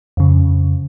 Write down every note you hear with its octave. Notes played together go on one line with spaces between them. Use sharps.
F2 C#3